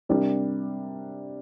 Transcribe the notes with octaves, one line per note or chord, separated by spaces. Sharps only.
C3 G3 D4 G4 A#4